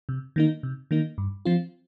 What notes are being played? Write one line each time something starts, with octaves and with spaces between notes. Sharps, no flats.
C3
D#3 A#3 D#4
C3
D#3 A#3 D#4
G2
F3 C4 F4